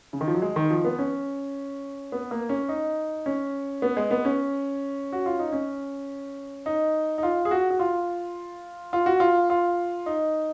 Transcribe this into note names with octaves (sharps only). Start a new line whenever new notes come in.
C#3
D#3
F3
F#3
G#3
D#3
F3
B3
C#4
B3
A#3
C#4
D#4
C#4
B3
G#3
B3
C#4
F#4
F4
D#4
C#4
D#4
D#4
F4
G#4
F#4
F#4
F4
F4
F#4
F4
F4
D#4